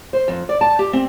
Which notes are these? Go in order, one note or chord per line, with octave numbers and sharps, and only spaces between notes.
C5
F2
D5
A5
G4
C4